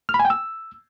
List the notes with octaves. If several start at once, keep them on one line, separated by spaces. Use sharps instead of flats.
F6
B5
G#5
G5
E6